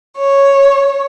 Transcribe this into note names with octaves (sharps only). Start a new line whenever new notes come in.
C#5